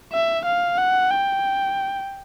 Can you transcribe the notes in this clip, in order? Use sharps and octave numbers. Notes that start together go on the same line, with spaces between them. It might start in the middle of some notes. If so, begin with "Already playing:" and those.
E5
F5
F#5
G5